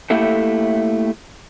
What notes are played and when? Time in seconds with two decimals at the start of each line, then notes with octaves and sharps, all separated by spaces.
0.10 A3 A#3 E4 G4 A4